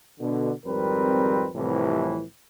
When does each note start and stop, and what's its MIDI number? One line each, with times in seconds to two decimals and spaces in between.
0.20 0.51 47
0.20 0.51 50
0.66 1.47 32
0.66 1.47 41
0.66 1.47 55
0.66 1.47 60
0.66 1.47 70
0.66 1.47 71
1.56 2.22 36
1.56 2.22 41
1.56 2.22 45
1.56 2.22 48
1.56 2.22 52